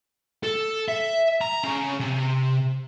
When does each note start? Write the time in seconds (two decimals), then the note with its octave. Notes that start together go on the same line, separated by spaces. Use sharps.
0.43 A4
0.88 E5
1.41 A#5
1.64 C#3
2.00 C3